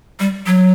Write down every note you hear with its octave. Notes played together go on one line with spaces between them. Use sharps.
G3
F#3